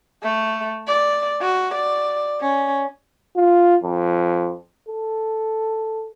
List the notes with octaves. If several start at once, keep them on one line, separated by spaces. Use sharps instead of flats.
A3
D5
F#4
D5
C#4
F4
F2
A4